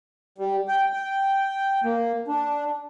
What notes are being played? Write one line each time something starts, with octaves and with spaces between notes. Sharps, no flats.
G3
G5
G5
A#3
D4